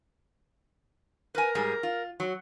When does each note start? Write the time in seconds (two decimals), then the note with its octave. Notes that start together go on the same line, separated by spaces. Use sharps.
1.35 A#4 B4 G#5
1.55 G#2 G3 G#4
1.83 F4
2.20 F#3